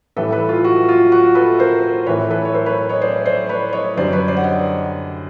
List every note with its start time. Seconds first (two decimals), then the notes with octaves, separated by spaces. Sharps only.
0.16 A2 E3 G3 A4 B4
0.32 A4 B4
0.49 F4
0.64 F#4
0.89 F4
1.12 F#4
1.35 A4 B4
1.59 A#4 C5
2.06 A2 E3 A3 B4 C#5
2.30 A4 B4
2.45 C#5
2.54 A#4 C5
2.66 B4 C#5
2.89 C#5 D#5
3.02 C5 D5
3.26 C5 D5
3.49 B4 C#5
3.73 C#5 D#5
3.97 F#2 D3 G3 C5 D5
4.12 B4 C#5
4.28 C5 D5
4.37 F#5
4.44 D#5